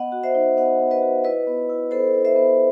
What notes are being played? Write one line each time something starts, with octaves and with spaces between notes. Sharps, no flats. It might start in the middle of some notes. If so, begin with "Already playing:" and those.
Already playing: B3 D#5 F#5
F#4
C5 E5
D#4
B3 D#5 F#5
B3
B4 D#5
F#4
E4 B4 D#5
B3
E4
B3 A4 C5
E4
C5 E5
B3